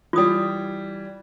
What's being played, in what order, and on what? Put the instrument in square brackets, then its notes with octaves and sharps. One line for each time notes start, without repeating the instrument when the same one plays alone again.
[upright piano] E3 G3 [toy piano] F4 D#6